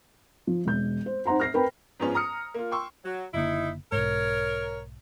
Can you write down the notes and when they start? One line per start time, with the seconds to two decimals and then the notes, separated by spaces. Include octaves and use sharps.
0.47 F3
0.65 E1 G6
1.06 C5
1.26 D#4 C5 F#5 A#5 C6
1.40 F6 A#6 C7
1.54 C4 A#4 B4 G5 B5
2.00 G#2 F3 B3 C#4
2.15 A#5 D#6 F6 C#7
2.54 A#3 F4
2.71 G5 C6 C#6 E6
3.04 F#3
3.34 F#1 D3 A#3 D#4 E4
3.92 B1 G#2 A#4 C#5